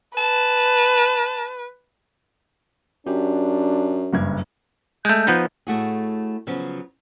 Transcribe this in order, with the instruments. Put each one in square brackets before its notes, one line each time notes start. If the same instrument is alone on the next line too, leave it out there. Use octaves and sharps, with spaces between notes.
[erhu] B4 [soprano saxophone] A5
[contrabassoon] F#2 [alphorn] D4 [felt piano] G4
[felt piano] F#1 G2 G#6
[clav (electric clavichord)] G#3 A3 [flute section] G6
[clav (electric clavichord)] F3 B3 D#4
[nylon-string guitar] A2 A3 F#4 G#4
C#3 F3 F#3 B3 C#4